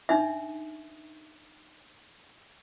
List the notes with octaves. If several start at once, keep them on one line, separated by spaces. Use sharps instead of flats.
D4 D#4 E5